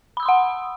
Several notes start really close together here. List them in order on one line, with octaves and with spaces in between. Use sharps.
B5 E6 D#6 C6 F#5